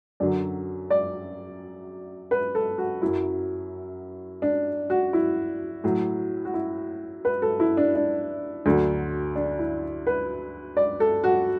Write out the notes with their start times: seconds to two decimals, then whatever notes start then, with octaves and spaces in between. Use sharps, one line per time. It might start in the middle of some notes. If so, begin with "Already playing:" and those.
0.20 F#2 D3 F#3 D5
0.90 D5
2.31 B4
2.55 A4
2.78 F#4
3.02 F#2 F#3 E4
4.42 D4
4.90 F#4
5.13 E4
5.84 A2 F#3
6.45 F#4
6.54 E4
7.25 B4
7.42 A4
7.60 E4
7.77 D4
7.95 D4
8.66 D2 D3 F#3
9.36 D4
9.59 E4
10.07 B4
10.77 D5
11.00 A4
11.24 F#4